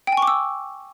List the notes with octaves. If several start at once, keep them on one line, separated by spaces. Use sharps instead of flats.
G5
G#5
C#6
D6
E6